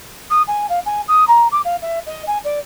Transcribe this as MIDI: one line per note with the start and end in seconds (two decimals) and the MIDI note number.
0.30 0.42 87
0.47 0.67 80
0.69 0.79 77
0.86 1.01 80
1.08 1.26 87
1.27 1.47 82
1.51 1.59 86
1.64 1.76 77
1.81 1.99 76
2.06 2.23 75
2.27 2.38 80
2.44 2.59 74